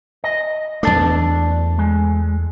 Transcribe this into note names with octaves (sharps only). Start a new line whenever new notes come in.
D#5
E2 A3 D4 A5
G#3